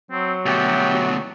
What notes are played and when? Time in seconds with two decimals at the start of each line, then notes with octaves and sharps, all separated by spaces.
0.11 F#3 C4
0.46 D2 B2 G4 E5 F#5 G5